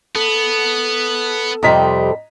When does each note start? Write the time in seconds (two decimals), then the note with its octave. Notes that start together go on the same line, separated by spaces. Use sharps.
0.15 B3 A4
1.63 F2 C3 G3 D#5 A#5 B6